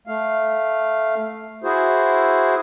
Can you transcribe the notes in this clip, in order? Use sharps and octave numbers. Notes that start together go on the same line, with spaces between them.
A3 F5
E4 F#4 G#4 C5